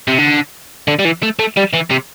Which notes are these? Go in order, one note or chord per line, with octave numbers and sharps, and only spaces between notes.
C3
D3
D3
G3
E3
A3
A3
G3
E3
C3